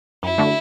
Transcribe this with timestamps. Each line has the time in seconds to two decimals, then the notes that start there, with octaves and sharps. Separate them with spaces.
0.23 F#2 E4
0.38 D3 A3 D4 F#4